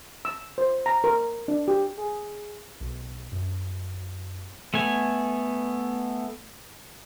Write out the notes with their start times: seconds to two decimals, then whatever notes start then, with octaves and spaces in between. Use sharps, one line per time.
0.25 E6
0.58 C5
0.86 A#5
1.04 A#4
1.48 D4
1.68 G4
1.98 G#4
2.80 B1
3.32 F#2
4.74 A3 B3 G#5